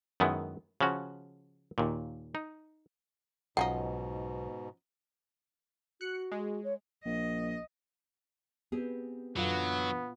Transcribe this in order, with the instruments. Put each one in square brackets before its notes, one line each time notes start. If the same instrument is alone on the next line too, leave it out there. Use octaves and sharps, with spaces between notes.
[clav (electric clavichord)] F#2 D#3 G#3 B3 E4
C#3 F3 C#4 F#4
D#2 A#2
D#4
[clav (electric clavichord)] B1 [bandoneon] G#2 B2 [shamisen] F3 C#4 D#4 [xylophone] F#5
[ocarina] F#4 [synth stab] F#6 C#7
[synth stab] G#3
[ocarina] C#5
[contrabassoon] A#1 [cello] D#5
[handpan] B3 [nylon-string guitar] C4 G4 G#4
[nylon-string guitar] F#2 D3 E3 [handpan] A#2 F4 F5 [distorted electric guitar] F#3 [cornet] B3